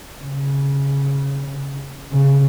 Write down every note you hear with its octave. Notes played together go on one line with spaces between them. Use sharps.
C#3
C#3